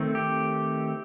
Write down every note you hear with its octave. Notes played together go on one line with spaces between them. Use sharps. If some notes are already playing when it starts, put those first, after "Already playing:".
Already playing: D#3 A3 C4
G4